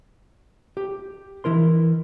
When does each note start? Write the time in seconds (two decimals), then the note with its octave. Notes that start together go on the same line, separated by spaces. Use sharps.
0.77 G4
1.44 E3 E4 A#4 C6